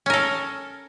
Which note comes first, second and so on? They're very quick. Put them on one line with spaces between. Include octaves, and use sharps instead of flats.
C#4 A#4 A4